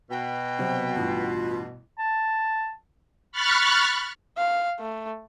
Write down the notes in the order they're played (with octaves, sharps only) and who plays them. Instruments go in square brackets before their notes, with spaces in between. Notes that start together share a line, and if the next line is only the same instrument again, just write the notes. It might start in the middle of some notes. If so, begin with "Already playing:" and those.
[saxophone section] B2 [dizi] G5
[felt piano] C3 F#3 B3 [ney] C5
[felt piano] A1 G2 [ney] F4
[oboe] A5
[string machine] B5 C#6 F6 F#6 A6
[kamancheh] F5
A3